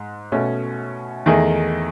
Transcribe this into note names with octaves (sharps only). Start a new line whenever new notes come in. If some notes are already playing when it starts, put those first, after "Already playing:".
Already playing: G#2
B2 A3 C#4
E2 D#3 A3 D#4 G#4